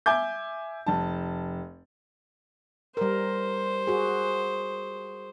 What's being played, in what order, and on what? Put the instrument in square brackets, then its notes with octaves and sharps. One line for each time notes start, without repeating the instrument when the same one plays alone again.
[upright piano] E5 G#5 D6 G6
F1 A5
[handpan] G3 A#4 [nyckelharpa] C5
[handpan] F#4 G#4